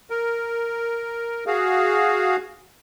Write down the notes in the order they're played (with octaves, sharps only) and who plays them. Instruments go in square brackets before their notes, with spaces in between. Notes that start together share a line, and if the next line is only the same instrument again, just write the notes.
[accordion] A#4
F#4 G#4 F5